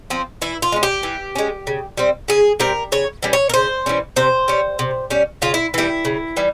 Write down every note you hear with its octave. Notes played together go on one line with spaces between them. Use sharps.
F3 C4
E3 E4
F4
G#3 C#4
G4
E3
G#3 C#4
C#3
G3 C4
C#3 G#4
G3 C4 A#4
C#3 C#5
E3 G3 C#4
C#5
A#4
C#3 C5
E3 G3 C#4
C3 C5
G3 C#4
C3
G3 C#4
C#3 F4
E4
E3 G3 E4
C#3
E3 G3